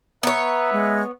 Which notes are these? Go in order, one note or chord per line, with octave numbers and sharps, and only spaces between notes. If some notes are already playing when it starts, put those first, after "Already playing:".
B3 B4 C#5 E5 A#5
G#3